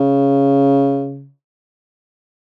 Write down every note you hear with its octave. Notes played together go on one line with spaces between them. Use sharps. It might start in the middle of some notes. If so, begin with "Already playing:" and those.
Already playing: C#3